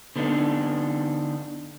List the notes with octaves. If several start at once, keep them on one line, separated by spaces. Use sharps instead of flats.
D3 B3 D4 D#4